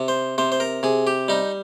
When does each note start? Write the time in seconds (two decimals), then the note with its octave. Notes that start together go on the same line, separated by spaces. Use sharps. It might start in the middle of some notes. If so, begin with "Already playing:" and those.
Already playing: C3
0.08 C5
0.38 C3 C5
0.52 C5
0.60 A#4
0.83 C3 G#4
1.07 G4
1.28 G3 D#4